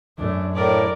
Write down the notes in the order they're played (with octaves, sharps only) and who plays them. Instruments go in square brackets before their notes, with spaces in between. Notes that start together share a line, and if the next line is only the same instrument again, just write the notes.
[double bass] F#2 [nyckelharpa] A3 D4
[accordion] A2 [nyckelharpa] A#4 D5